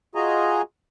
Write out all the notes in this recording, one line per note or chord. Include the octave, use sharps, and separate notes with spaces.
F4 F#4 G#4 D#5 G#5 A#5